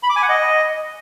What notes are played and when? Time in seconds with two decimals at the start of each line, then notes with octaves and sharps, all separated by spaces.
0.03 B5
0.09 D6
0.16 G#5
0.22 F#5
0.29 D#5